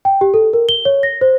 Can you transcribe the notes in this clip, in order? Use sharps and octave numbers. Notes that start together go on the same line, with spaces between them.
G5
G4
A4
A#4
G7
C#5
A#6
C5